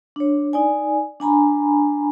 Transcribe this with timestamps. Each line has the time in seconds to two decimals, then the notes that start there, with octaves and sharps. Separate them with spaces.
0.16 D4 C#5
0.53 D#4 D5 G#5
1.20 D4 G#5 A#5 B5